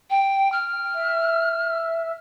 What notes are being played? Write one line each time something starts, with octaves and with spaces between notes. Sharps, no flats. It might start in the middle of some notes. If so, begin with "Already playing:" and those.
G5
F6
E5